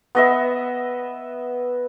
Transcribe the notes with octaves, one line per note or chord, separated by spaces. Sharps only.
B3 D#5 E5